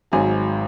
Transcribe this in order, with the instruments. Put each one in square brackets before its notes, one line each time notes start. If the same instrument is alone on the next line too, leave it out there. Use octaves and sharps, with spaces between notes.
[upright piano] G#1 G#2 F#3 G#5